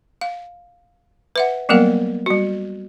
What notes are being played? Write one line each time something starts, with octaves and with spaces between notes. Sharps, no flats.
F5
B4 E5 F#5
F#3 G3 A#3 B3 A#4 F5
G3 F#4